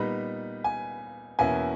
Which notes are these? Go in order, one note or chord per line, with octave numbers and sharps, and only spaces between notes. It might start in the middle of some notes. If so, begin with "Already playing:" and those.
Already playing: A#2 G3 B3 D#4 B5
G#5
E2 B2 A#3 C#4 E4 G#5